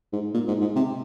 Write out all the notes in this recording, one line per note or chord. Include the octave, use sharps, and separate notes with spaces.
G#2
A#2
G#2
G#2
C3